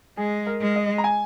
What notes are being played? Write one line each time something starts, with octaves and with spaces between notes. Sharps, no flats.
G#3 G#4
A#4
G#3
D#5
A#5
G#5